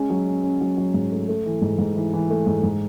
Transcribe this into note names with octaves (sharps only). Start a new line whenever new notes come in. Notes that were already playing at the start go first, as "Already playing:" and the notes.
Already playing: G#3 C#4
F#3
C#4
C#4
F#3
F#3
G#2
A3
A3
E3
G#2
G#2
E3
E3
A3
G#2
G#2